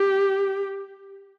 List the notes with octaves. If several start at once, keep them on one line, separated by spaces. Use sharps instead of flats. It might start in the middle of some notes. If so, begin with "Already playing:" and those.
Already playing: G4